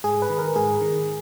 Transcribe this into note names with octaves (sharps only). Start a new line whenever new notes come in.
G#2 G#4
B4
D#3
A#4
G#2 G#4
D#3